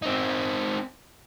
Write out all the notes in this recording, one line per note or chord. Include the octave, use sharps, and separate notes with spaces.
C4 D#4